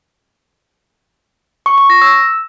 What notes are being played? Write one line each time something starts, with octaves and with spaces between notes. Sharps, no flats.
C#6
C#6
A#6
E6